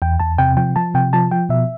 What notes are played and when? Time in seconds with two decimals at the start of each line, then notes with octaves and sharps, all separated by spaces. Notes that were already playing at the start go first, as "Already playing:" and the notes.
0.02 E2 G5
0.20 E2 A5
0.38 C3 G5
0.57 F3 G5
0.76 F3 A5
0.94 C3 G5
1.13 F3 A5
1.31 F3 G5
1.49 B2 E5